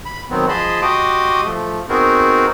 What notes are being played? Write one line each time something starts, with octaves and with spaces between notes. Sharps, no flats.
B5
D#3 F#3 B3 C4
F3 G#4 D#5 A5 B5 C6
F#4 G4 D#5 C6 D6 D#6
F3 A3
B3 C4 D#4 F#4 G#4 A#4